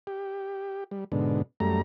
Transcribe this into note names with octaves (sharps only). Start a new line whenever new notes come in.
G4
G3
G#2 B2 D3
F#2 G3 A3 A#5